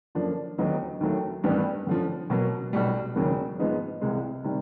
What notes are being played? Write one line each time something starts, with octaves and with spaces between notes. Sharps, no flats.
F#2 D3 F3 A#3 D4
D#2 D3 F#3 B3 D#4
D#2 D#3 F#3 A3
A1 G2 D#3 G3 B3
F#2 D3 F3
B2 F#3 A#3
B1 B2 G3
E1 D#2 C#3 F#3 A#3
G#2 F3 G#3 B3 D#4
C2 C3 E3 G#3
C3 D#3 G3